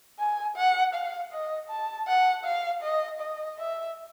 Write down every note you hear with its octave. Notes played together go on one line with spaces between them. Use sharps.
G#5
F#5
F5
D#5
A5
F#5
F5
D#5
D#5
E5